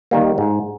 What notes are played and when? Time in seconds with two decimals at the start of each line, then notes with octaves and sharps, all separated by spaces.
0.11 D#3 G3 A#3
0.38 G#2